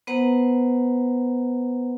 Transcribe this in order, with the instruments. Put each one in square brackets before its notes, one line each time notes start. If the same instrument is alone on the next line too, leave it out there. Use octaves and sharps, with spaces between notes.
[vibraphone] B3 B4 C5 F#5 A#5